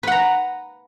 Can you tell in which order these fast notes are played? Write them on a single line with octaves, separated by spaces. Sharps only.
B4 F#5 A#5